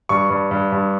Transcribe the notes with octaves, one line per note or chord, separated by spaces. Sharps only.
G2 C#6
G2
G2
G2